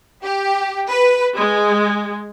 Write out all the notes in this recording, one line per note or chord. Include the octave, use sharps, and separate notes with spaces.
G4
B4
G#3